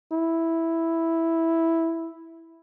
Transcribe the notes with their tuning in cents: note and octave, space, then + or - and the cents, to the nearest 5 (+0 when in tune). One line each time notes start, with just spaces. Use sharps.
E4 -5